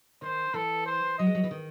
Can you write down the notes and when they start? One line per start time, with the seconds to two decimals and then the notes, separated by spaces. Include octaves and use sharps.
0.22 D#3 C5
0.54 E3 A4
0.86 C5
1.18 F#3 D#5
1.26 G#3
1.35 F#3
1.44 E3
1.51 D#3